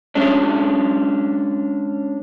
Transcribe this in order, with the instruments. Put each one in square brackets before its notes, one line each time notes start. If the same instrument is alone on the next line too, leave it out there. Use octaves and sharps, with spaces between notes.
[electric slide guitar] G#3 C#4 D4